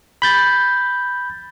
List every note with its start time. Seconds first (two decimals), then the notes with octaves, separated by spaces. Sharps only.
0.22 B5 G6 A6